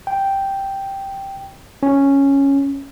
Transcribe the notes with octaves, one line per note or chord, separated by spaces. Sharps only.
G5
C#4